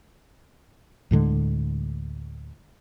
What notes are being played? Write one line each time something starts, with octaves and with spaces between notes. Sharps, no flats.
D2 A2 D3 G#3